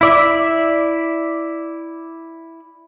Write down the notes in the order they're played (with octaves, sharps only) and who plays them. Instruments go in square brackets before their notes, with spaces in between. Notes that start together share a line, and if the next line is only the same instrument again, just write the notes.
[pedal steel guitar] E4 D5 E5